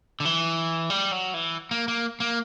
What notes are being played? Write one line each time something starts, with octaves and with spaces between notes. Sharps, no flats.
D3
E3
G3
F#3
E3
A#3
A#3
A#3